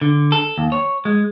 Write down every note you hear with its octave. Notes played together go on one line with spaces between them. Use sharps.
D3
A4
D#2
C#5
G#3